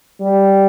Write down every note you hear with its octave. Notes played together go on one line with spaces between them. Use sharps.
G3